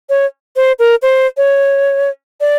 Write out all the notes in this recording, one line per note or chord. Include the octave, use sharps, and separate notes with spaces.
C#5
C5
A#4
C5
C#5
D5